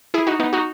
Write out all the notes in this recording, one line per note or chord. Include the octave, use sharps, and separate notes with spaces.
E4 G#4
D#4 F#4
B3 D#4
D#4 F#4